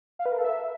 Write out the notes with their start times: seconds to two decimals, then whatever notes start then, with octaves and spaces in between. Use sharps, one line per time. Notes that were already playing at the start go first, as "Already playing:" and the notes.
0.19 F5
0.26 B4
0.32 A#4
0.38 A4
0.44 E5